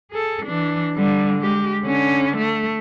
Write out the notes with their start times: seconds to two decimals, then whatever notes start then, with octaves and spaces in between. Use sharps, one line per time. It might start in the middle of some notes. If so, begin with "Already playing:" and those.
0.11 G#4 A4
0.46 E3 D4
0.95 D3 G3
1.41 G#3 G4
1.83 D3 C#4
2.38 A3